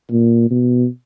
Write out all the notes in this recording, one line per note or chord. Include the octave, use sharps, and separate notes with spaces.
A#2
B2